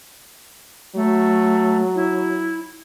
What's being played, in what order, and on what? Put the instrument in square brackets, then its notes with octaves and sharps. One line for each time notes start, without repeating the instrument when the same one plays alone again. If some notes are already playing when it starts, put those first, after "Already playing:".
[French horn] F#3 [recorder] A3
[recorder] E4